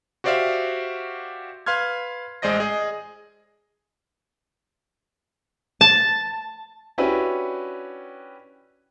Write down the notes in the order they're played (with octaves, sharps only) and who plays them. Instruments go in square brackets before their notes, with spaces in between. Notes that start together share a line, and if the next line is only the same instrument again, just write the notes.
[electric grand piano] F#4 G4 C5 D5 E5 F5
B4 F5 C6 F6 G#6
A1 G#3 C5 D5 D#5 A#6
G#4 D#5
[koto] A5
[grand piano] C#4 D4 E4 F#4 G4 B4